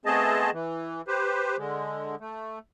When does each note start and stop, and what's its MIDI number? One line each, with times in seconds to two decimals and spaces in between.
0.06 0.50 57
0.06 0.50 59
0.06 0.50 60
0.06 0.50 68
0.06 0.50 75
0.06 0.50 81
0.53 1.02 52
1.08 1.57 67
1.08 1.57 71
1.08 1.57 72
1.58 2.15 50
1.58 2.15 56
2.20 2.59 57